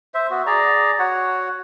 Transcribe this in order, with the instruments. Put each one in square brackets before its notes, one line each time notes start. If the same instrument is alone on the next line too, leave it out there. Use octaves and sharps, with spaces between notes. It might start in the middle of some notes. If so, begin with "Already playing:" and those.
[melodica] C5 E5
B3 F#4
G#4 D5 A#5
F#4 C#5 F#5